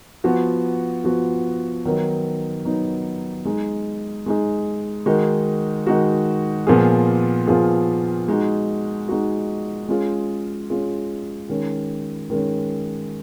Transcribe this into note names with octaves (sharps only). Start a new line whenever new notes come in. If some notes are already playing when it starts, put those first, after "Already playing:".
F3 B3 F#4
F3 B3 F#4
D#3 F#3 B3 D#4
D#3 F#3 B3 D#4
G#3 D#4 G#4
G#3 D#4 G#4
D#3 G#3 D#4 F#4
D#3 G#3 D#4 F#4
A#2 F3 B3 F4 G#4
A#2 F3 B3 F4 G#4
G#3 D#4 F#4
G#3 D#4 F#4
G#3 C#4 F4 G#4
G#3 C#4 F4 G#4
D#3 G#3 C#4
D#3 G#3 C#4